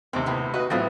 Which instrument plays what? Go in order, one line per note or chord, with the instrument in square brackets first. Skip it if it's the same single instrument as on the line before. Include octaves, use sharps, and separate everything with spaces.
[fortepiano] D#2 C3 [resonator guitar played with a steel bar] C4
[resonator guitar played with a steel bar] A2 B3
[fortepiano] F#4 B4 [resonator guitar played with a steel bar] D#5
[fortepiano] A2 F#3 C4 [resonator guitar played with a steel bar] A3 B3 F4